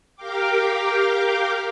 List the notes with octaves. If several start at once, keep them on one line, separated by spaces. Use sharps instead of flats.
G4 A#4 F5 G5 D6